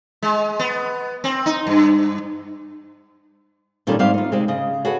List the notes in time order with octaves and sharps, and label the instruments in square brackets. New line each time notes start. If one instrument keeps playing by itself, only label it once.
[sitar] G#3
B3
C4
D#4
G2
[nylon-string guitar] A#2 D#3 G3 C#4 F4 A4
G#2 G3 C4 C5 E5 F5
D#4 F4
C3 G#3 C4 G4
C#3 D#5
F#4 G#4 A4 B4 C#5 F#5